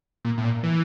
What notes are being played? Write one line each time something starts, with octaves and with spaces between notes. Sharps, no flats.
A#2
A2
A#2
E3